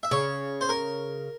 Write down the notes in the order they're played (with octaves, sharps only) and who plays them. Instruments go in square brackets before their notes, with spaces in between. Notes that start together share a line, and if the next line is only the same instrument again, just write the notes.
[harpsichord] E5
[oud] C#3 [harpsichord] C#5
[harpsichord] C5
A#4